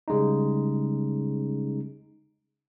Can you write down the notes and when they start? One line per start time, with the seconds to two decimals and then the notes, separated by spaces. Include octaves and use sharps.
0.08 C#3 G3 G#3 C#4 D#4